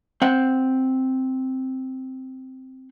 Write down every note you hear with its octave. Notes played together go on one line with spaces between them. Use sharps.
C4 F#5